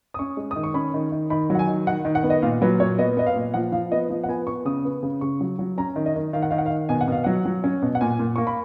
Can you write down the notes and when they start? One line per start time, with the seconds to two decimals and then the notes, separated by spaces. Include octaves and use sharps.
0.14 D#6
0.19 C#4 C#6
0.37 G#3
0.51 D#6
0.56 D#3
0.64 C#6
0.74 C#4 B5
0.94 D#3
1.12 D#3
1.30 D#3 B5
1.50 F#3
1.55 F#5
1.59 G#5
1.68 D#3
1.87 D#3 F#5
2.05 D#3
2.15 F#5
2.23 B3
2.30 D#5
2.42 A#2 F5
2.62 F#3 B4
2.80 A#2 C#5
2.98 B3 D#5
3.17 B3 D#5
3.26 F5
3.35 A#2
3.54 F3 F#5
3.72 F3 F5
3.92 B3 D#5
4.10 F3
4.23 F#5
4.28 B3 G#5
4.47 B3 C#6
4.65 C#3 D#6
4.85 B3
5.03 C#3
5.21 C#3 C#6
5.41 F#3
5.59 F#3
5.78 C#4 A#5
5.96 D#3
6.06 D#5
6.16 D#3
6.33 D#3 F5
6.42 F#5
6.51 D#3 F5
6.58 F#5
6.66 F5
6.70 D#3
6.89 B2 G#5
7.01 F#5
7.08 B2 F5
7.24 F#3 F#5
7.45 F#3
7.64 C#4
7.82 B2
7.95 F#5
8.01 A#2 G#5
8.19 A#2
8.36 A#3 C#6
8.47 B5